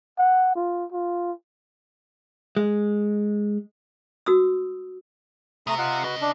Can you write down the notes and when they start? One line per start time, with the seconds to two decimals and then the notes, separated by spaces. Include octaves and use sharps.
0.18 F#5
0.55 F4
0.92 F4
2.57 G#3
4.26 F#4 D#6 E6
5.67 C3 A3 A#5 D#6
5.78 F4 D#5 F#5
6.04 C#4 F#4 B4 D#5
6.21 D4